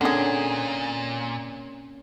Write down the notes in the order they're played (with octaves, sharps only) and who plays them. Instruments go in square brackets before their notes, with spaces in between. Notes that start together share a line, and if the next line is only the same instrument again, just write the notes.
[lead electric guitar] A#2 [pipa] D3 G#4 [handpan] A#3 C4 C#4